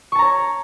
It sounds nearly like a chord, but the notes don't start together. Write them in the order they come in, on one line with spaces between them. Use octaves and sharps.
C#6 A5 A#5 C#5